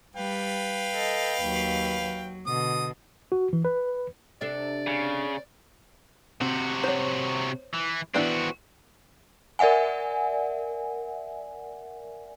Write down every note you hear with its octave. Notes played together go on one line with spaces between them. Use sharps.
G3 B4 F5 G5
A4 D#5
D#2 F#3
F#3
B2 D3 D#6
F#4
E3
B4
C3 D4 A4 D5
C#3
C3 C4 F#4
C5 C#5
E3
E3 B3 C4 D4 F#4
A#4 D5 E5 F#5 G#5